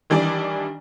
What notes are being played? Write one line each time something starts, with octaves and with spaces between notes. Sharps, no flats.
D#3 E3 G3 D4 D5